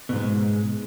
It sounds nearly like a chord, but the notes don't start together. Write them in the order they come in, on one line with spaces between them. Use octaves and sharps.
B2 G#2 G#3